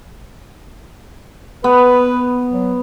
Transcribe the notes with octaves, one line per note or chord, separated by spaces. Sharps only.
B3 B4
F#3